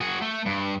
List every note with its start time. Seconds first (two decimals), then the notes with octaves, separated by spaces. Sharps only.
0.01 F#4 G#4
0.21 A3
0.45 G2